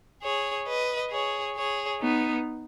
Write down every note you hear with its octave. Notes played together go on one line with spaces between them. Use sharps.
G#4 C#5
B4 D#5
G#4 C#5
G#4 C#5
B3 D#4